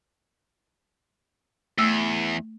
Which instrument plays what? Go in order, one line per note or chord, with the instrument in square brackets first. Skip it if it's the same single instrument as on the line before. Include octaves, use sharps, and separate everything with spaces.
[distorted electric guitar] E2 [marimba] A3 E6